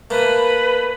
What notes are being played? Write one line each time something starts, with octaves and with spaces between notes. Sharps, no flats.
A3 A#3 B4